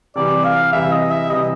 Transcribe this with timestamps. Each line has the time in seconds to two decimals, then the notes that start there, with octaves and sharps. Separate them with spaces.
0.16 C3 E3 G3 D5
0.44 F5
0.72 C3 E3 G3 E5
0.92 D#5
1.11 E5
1.30 C3 E3 G3 D#5